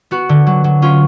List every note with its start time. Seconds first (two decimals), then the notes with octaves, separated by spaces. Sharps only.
0.11 B3 F#4
0.29 D3
0.47 F#3
0.64 F#3
0.82 C#4 F4